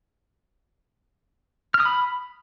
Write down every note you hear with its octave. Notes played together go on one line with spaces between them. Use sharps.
F6
D#6
B5